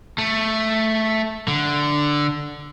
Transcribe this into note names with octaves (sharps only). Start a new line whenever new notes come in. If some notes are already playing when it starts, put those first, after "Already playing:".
A3
D3